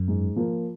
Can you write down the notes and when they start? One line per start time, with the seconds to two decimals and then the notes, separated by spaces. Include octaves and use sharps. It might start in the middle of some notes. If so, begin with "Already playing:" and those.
Already playing: F#2
0.08 G#2
0.36 F3 A#3